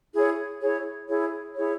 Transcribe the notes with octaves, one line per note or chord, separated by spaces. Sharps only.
E4 G#4 C#5
E4 G#4 C#5
E4 G#4 C#5
E4 G#4 C#5